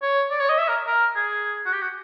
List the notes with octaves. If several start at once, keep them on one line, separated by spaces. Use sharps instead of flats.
C#5
D5
C#5
D#5
E5
A#4
A#4
G#4
F#4
G4
F#4